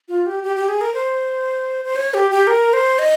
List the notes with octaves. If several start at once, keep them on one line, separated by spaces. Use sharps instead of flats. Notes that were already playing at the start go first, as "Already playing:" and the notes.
F4
G4
G4
G4
G#4
A#4
C5
C5
C#5
G4
G4
A#4
C5
D#5